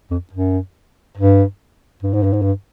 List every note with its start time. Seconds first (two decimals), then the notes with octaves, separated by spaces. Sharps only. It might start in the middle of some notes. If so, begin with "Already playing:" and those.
0.11 F2
0.33 F#2
1.17 G2
2.03 G2
2.14 G#2
2.23 G2
2.33 G#2
2.42 G2